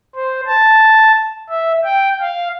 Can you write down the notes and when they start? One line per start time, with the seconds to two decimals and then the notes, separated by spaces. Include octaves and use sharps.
0.16 C5
0.47 A5
1.49 E5
1.84 G5
2.21 F5